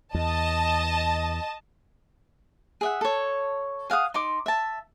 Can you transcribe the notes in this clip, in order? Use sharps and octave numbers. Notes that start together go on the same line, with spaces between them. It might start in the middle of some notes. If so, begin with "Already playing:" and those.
E2 D#5 A5
G#4 E5 F#5
A4 C#5
G#4 F5 F#5 D#6
D#4 C6 D6
E5 A5